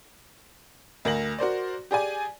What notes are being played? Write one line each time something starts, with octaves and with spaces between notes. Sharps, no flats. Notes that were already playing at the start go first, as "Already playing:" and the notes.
D2 A#4 A#6 F#7
F#4 A#4 C5 D5
G4 G#4 D5 G#5